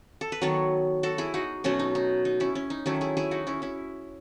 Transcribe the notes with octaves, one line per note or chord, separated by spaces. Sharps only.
A4
B4
D#3 F#3 B3 A4 C#5
F#4 A4
E4 G#4
D#4 F#4
B2 F#3 A3 C#4
D#4
D#4
D#4
C#4 E4
C#4
D#4
D#3 F#3 A3 C#4 E4
E4 G#4
E4 G#4
D#4 F#4
C#4 E4
C#4 E4